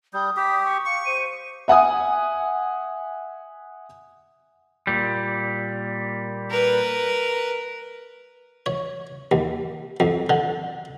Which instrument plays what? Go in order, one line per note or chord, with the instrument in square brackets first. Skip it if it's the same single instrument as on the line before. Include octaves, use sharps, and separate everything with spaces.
[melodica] G3 [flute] D#6 [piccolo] G6
[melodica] G4 [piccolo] B6
[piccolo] C#6
[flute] F5 [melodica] C#6 [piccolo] C#7
[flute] C5 [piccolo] D#7
[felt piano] E5 F#5 G#5 D#6
[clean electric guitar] A#2 G3
[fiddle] A#4 B4
[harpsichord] C#5
D#2
F2
D3